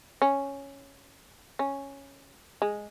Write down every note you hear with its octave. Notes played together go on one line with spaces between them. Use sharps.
C#4
C#4
G#3